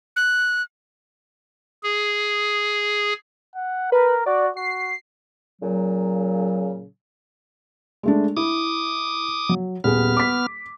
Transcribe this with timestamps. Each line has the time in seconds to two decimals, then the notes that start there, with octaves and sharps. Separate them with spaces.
0.16 F#6
1.83 G#4
3.55 F#5
3.92 A#4 B4
4.26 F#4 D5
4.57 F#4 C7
5.62 A#2 C#3 F#3
8.03 G#3 A3 D4
8.37 E4 D6 D#6
9.49 F#3
9.84 D#1 B3 G#4 F6
10.17 D6 B6